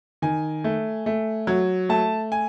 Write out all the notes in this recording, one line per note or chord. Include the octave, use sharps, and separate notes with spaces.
D#3 G#5
A3
A3
F#3
A3 A5
G#5